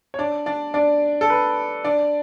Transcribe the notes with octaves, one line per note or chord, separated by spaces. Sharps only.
C#5
D4 D5
D4 D5
D4 D5
A4
B4
D4 D5